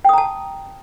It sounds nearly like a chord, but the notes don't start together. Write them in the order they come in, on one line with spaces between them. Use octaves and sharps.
G5 D#6 A#5 A5